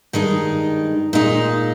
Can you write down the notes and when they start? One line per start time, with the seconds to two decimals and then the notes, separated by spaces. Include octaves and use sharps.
0.13 G2 D#3 G#3 D#4
1.13 A#2 G#3 D#4